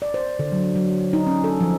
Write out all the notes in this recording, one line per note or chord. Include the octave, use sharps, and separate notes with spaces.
D5
C5
D3
F#3
F#3
D#4
C#4
A4
F3